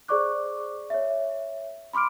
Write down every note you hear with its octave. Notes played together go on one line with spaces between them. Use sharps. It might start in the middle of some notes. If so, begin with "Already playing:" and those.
G#4 C5 D5 C#6 D6 F#6
C#5 E5
B5 C6 D6 F6 D7